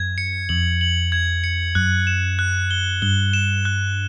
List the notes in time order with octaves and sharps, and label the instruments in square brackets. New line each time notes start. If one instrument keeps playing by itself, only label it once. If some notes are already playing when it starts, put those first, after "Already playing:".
Already playing: [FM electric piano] F#2 [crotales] G#6
[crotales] C#7
[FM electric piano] F2 [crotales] F#7
[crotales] F#7
G#6
C#7
[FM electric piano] F#2 [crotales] F#6
[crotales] E7
F#6
G7
[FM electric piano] G2 [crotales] G7
[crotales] E7
F#6